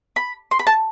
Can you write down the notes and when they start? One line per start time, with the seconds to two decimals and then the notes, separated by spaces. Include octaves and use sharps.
0.16 B5
0.51 C6
0.59 B5
0.67 A5